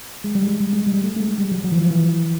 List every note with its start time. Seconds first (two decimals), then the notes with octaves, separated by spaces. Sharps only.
0.24 G#3
0.35 G3
0.47 G#3
0.60 G3
0.73 G#3
0.87 G3
1.04 A3
1.16 A3
1.20 G#3
1.38 G3
1.52 F#3
1.64 F#3
1.72 E3
1.77 F3
1.90 E3